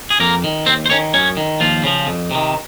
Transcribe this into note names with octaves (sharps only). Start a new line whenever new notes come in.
G#4
F2 A#3 A#4
D#3
D#2 C4 C5
C5
D#3 C#4 C#5
F#2 C#4 C#5
D#3
D#2 F3 F4
C#3 F3
F2
C3 D#3